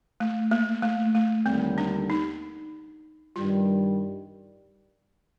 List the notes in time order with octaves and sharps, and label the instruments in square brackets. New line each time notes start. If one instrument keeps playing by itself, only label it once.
[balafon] A3
A#3
A3
A3
[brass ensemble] D#2 D3 G3 [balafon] C4
[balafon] D4
D#4
[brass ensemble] G2 D#3 G3 [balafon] F4